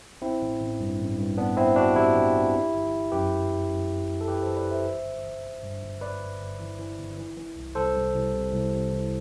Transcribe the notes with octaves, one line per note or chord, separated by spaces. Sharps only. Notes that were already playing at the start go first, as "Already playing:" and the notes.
A1 C4 E4
A1
A1
G2
A1
G2
A1 B3 D4
G2 C4 E4
A1 D4 F#4
A1 E4 G4
E3
E3
G1
G1
G1
F#2 G4 B4
F#2
G1
F#2
G1
G1
A4
E3 G4 B4
E3 A4 C5
B4 D5
G1
C5 E5
G1
G1
E3
G1
G2
G1
G1 B4 D5
G1
G1
E3
E3
G1
E3
E3
C2
C2 A4 C5
C2
C2
C3
C2
C3
E3